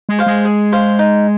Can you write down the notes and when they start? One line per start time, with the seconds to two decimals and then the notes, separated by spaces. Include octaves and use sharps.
0.09 G#3
0.19 C5 F5
0.26 G#3
0.45 G#4
0.72 C5 F5
0.99 D#4